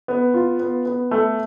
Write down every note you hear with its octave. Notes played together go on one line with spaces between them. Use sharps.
B3
F4
B3
B3
A3